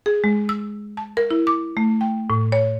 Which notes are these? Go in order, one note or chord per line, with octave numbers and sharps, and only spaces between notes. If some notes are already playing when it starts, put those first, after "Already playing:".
G#4
G#3
E6
A5
A#4
E4
D6
A3
G5
A2
C#5